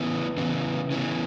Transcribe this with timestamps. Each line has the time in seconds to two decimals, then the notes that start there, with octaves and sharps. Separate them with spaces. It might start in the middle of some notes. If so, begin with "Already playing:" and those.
Already playing: C#3 E3 B3
0.38 C#3 E3 B3
0.91 C#3 E3 B3